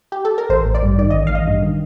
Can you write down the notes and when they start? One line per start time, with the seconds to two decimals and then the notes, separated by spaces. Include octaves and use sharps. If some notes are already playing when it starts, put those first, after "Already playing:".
0.12 G4
0.25 A4
0.38 A#4
0.49 A1 C5
0.66 A1
0.75 D5
0.83 G2
0.98 D#3 D5
1.10 D#5
1.14 A1
1.27 F5
1.30 A1
1.35 D#5
1.47 G2
1.62 D#3